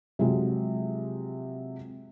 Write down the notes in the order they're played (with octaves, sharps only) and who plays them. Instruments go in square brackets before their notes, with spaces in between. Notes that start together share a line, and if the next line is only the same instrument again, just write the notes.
[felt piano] C3 F3 F#3 G#3